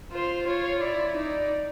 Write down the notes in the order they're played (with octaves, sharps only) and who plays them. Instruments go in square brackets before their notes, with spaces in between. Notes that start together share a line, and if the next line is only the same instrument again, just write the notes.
[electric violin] F4 [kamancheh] C5
[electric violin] F4 [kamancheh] C#5
[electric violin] E4 [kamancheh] D5
[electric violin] D#4 [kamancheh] D5